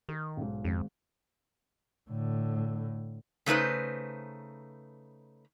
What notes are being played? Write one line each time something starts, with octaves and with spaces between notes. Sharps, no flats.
D#3 A#4
B1 G#2
G#1 F2 G#2
A2 D3
C#3 A3 D#4 B4 C5